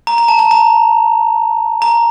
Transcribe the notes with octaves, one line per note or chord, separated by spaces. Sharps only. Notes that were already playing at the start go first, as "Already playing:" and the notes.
A#5
A#5
A5
A5
A#5
A#5